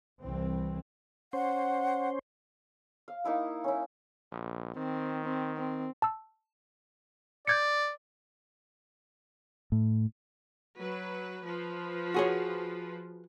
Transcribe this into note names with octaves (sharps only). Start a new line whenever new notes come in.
C2 E3 C4
C#4 C5 F#5
F5
A#3 D#4 E4 F5
C#4 E4
A#1
D#3 C4
C4
C4
A5 E6
D5 G6 G#6 C#7
A2
F#3 B4
F3 B4
F#4 G#4 C#5